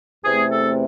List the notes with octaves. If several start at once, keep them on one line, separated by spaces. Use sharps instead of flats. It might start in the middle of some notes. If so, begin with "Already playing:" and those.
E2 C3 E3 A3 C4 G#4
A4